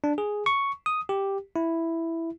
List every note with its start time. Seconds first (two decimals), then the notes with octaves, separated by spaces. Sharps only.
0.04 D4
0.18 G#4
0.46 C#6
0.86 D#6
1.09 G4
1.56 E4